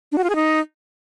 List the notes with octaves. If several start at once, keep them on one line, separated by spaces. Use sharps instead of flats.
D4
F#4
F4
G#4
D#4